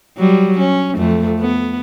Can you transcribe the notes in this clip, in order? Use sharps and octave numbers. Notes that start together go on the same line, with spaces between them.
F#3 G3
C#4
F2 A3
B3